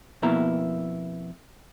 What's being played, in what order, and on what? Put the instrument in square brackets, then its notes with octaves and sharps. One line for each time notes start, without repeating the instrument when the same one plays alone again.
[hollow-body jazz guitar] F2 B2 A#3 B3 E4 A#5